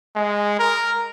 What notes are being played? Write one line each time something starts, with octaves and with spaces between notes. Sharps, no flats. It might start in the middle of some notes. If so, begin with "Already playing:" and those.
G#3
A#4